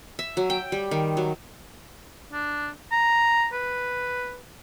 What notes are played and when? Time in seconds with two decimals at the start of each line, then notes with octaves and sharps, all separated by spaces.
0.19 E5
0.37 F#3
0.50 G5
0.72 G3
0.91 D#3
1.17 F#3
2.33 D4
2.92 A#5
3.53 B4